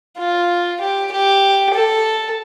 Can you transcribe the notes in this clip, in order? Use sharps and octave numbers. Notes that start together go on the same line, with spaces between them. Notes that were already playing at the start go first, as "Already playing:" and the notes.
F4
G4
G4
A4